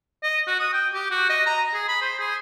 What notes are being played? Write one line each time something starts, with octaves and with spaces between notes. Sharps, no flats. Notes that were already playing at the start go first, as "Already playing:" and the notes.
D#5
F#4
D#6
G5
G4
F#4
D#5
A#5
G#4
B5
C5
G#4